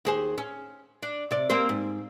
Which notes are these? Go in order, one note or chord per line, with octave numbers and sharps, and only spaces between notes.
D#2 G#4 C5
C#4
D4
C3 D5
A#3 C4 C5
G#2